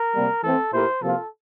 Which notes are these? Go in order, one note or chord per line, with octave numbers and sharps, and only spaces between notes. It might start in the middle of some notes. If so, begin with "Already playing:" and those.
Already playing: A#4
C3 G3 A#3
E3 A3 C4 A4
A#2 A3 E4 G4 A#4 C5
C3 F3 A#3 F4 A4